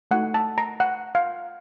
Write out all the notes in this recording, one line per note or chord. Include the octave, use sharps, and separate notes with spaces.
A3 D#4 F#4 F#5
A5
A#5
F#5
F5